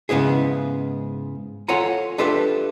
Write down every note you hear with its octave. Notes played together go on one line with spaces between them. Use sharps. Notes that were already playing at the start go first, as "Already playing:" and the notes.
G#2 C#3 B3 E4 G#4
F4 A4 C#5 F#5 G#5 A#5
D4 F4 G4 A4 B4 E5